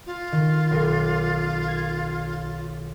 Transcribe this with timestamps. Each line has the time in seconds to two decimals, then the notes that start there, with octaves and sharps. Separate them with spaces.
0.06 F4
0.32 D#3
0.71 B1 A#4
1.68 G#6